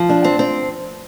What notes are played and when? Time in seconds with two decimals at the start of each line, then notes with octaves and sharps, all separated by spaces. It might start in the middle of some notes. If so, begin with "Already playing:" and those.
Already playing: F3
0.09 D4
0.24 C4
0.39 C4